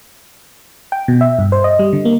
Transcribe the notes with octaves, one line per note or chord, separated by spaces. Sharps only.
G5
B2
E5
G2
C5
D#5
G3
D3
A#3